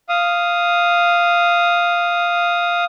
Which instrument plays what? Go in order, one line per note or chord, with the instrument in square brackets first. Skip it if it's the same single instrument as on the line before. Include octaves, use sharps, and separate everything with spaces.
[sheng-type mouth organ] F5 D#6